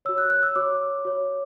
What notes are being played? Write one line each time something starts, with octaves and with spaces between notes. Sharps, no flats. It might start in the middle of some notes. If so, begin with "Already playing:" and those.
F#4 C#5 E6
F#6
F#6
E6
F#4 C#5 D6
F#4 C#5